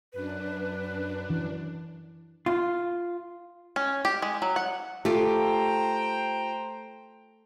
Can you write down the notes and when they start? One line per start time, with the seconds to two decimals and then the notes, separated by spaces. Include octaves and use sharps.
0.13 F#2 D4 B4
1.30 E3
2.46 F4
3.76 C#4
4.05 G4
4.22 G#3
4.42 F#3
4.56 F#5
5.05 A3 F4 G4 C5 G5 A#5